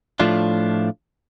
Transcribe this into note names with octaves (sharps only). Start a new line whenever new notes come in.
A2 F3 A3 D4 F4